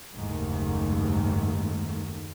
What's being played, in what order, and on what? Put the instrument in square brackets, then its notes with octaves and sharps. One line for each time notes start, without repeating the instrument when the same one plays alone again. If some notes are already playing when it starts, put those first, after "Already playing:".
[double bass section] F#1 D#2 G#2 D#3 A3